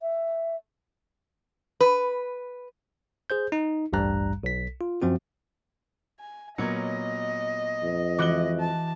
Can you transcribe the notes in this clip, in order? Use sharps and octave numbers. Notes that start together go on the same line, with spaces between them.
E5
B4
G#4 C5 G6
D#4
A1 D2 G2 G3 A#5 F#6
B1 B6
F4
F#2 F3 C4 F#4
G#5
A#2 F#3 B3 A#4 C#5 D#5 C#7
F2
E3 G#3 F#4 D6 F#6 G7
A5